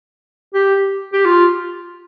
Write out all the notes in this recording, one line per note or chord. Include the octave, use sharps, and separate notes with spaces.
G4
G4
F4